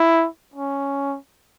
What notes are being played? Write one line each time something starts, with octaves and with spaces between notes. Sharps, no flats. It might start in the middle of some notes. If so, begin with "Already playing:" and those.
Already playing: E4
C#4